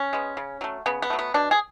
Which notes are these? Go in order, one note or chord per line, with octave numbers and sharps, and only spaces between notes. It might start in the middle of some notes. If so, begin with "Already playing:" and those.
Already playing: C#4
G#3 B3
C#3
F#3 A3
C#3 B3
B3
F#3 A3
B3
B2 D4
G#4